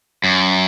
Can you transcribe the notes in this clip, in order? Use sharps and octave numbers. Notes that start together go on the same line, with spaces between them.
F#2